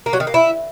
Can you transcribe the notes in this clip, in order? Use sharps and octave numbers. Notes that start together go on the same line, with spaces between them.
A#3
F#3
D#3
A#3
E4